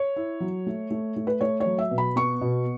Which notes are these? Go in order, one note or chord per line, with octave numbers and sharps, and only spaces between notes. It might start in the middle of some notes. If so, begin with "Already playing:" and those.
Already playing: C#5
E4
F#3
A3
A3
A3
B4
A3 C#5
C#5
F#3
E5
B2
B5
B3 C#6
B2